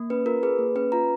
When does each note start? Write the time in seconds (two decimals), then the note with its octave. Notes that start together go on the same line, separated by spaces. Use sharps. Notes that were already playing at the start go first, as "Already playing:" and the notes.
Already playing: A#3
0.10 C#4 B4
0.26 F4 A#4
0.43 G#4 B4
0.59 A#3
0.76 C#4 B4
0.92 F4 A#5